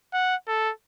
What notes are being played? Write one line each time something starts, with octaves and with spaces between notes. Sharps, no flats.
F#5
A4